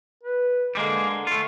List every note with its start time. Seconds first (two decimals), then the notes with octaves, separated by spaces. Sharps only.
0.23 B4
0.75 D3 G3 G#3 A#3
1.27 A3 F4